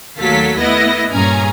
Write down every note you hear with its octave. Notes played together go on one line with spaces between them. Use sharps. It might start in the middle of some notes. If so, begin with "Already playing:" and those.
D#2 F#3 A3 A4 F5 B6
A3 B3 E4 D#5 A#6
G2 A#2 C#4 G#4 G#5 A#5